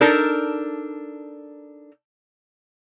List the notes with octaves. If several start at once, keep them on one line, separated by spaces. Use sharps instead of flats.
D4 D#4 A4 A#4 A5